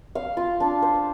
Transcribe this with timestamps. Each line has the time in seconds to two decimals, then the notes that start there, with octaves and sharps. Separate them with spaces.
0.15 F5
0.37 F4
0.60 D4
0.82 C5